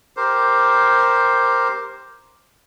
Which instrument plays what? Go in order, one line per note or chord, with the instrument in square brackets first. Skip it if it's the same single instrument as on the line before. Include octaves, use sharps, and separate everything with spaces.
[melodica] G4 A#4 C5